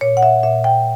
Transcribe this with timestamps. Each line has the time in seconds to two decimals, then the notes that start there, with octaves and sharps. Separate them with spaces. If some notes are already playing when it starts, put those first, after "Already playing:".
0.01 A#2 C#5
0.17 F#5
0.23 E5
0.43 A#2 E5
0.64 G5